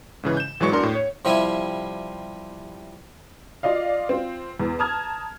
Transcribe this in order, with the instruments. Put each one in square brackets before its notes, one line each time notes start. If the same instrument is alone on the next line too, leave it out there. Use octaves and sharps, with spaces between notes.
[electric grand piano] G#2 C#3 E3
G6 E7
G#1 E3 F#3 G#3 C#6 C#7
E2 D4 F#4 A#4 C6
A2
C#5
[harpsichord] C3 F3 G3 E4 G#5
[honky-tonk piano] F4 D5 D#5 F5
C4 F4
E2
A5 A#5 D#6 F6 G#6